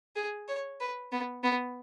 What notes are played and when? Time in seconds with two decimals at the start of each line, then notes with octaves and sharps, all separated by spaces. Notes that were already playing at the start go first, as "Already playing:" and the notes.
0.16 G#4
0.48 C#5
0.80 B4
1.12 B3
1.44 B3